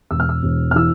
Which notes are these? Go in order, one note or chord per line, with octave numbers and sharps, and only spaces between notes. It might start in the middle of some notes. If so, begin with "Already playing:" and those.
E1 E6
F6
E6
E1
F6
E3 E6